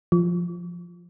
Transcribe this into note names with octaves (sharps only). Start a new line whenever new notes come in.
F3